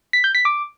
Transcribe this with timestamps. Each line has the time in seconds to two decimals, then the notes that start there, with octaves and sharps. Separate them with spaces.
0.13 B6
0.24 G6
0.35 B6
0.45 D6